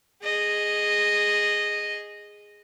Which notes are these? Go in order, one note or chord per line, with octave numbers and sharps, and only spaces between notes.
G#4 D#5